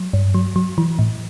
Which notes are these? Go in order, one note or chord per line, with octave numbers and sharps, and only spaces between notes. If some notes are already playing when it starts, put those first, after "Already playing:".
Already playing: F#3
G2
F#3
F#3
E3
A2